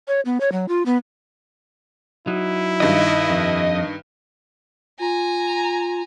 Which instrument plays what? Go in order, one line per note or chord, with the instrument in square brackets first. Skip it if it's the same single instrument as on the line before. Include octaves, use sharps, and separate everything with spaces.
[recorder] C#5
B3
C#5
F#3
F4
B3
[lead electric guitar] F#3 D#4 [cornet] E4
[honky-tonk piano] G2 D#3 [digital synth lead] D#5
[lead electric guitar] F2
[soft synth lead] F4 [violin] G#5 A#5